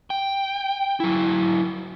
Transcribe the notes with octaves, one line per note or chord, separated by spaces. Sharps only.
G5
F#3 E4